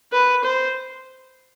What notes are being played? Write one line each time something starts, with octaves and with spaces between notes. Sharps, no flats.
B4
C5